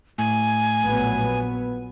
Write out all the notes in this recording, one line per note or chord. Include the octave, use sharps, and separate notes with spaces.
A2 G#5
A#1 F#3 B3